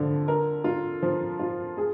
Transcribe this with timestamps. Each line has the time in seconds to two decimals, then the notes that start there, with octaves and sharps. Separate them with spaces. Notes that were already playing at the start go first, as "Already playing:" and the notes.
Already playing: D3 F3
0.28 A#4
0.64 F4
1.03 F3
1.39 F4
1.77 G#4